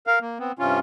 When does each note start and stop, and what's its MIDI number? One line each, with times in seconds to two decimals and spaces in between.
0.07 0.19 70
0.07 0.19 77
0.21 0.38 58
0.39 0.52 59
0.39 0.52 60
0.59 0.79 43
0.59 0.79 48
0.59 0.79 61
0.59 0.79 65